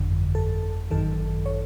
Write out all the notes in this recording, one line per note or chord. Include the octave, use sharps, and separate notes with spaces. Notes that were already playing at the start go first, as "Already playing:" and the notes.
Already playing: G1 F2 D3
A4
G#1 F#2 D#3 A4
C#5